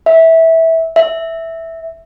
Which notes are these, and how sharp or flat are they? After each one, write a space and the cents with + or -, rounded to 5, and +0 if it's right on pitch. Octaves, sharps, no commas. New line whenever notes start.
E5 -15
E5 -5